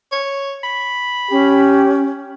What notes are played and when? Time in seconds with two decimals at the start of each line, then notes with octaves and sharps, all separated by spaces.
0.12 C#5
0.64 B5
1.31 C#4 G4